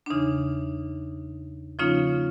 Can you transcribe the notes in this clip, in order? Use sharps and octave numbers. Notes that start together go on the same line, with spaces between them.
D4
E2 C#3 E3 D#4
C#3 F3 A#3 C#4 D#4 F4